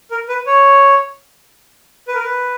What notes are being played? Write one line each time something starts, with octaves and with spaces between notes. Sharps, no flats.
A#4
B4
C#5
B4
A#4
B4